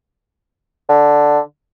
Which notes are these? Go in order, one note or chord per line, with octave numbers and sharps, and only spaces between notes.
D3